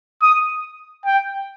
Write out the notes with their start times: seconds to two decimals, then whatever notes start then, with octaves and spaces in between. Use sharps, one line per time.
0.22 D#6
1.06 G5